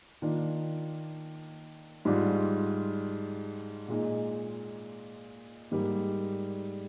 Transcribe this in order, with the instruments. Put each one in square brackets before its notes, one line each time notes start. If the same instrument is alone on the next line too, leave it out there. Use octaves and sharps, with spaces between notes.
[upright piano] D#3 A#3 D4 F4
G#2 G3 D4 F4
A#2 G#3 D#4
G#2 G3 A#3